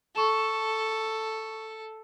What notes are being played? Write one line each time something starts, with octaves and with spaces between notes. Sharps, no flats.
A4 C#6 E7